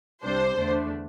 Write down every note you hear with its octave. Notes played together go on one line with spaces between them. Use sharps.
C2 C3 G3 D4 C5
E2 D3 A3 D4